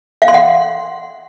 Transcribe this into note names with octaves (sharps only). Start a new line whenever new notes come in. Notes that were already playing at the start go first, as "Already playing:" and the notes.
F5
C6
F#5